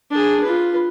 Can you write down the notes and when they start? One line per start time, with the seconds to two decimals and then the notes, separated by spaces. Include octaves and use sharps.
0.10 D4 G#4
0.43 F4 B4